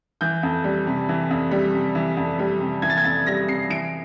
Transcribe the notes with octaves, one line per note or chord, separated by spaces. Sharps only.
E3 G6
F2
G3
C3
E3
F2
G3
C3
E3
F2
G3
C3
E3 G#6
A6
G#6
F2 A6
G3 A#6
C3 C7
E3 D7